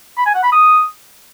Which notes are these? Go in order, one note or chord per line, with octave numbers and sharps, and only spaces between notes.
B5
G#5
F#5
B5
D#6